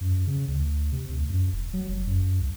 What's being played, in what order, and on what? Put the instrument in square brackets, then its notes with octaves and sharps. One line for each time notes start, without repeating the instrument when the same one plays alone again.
[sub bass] F#2
C#3
D2
C3
D2
F#2
E1
F#3
F#1
F#2
C2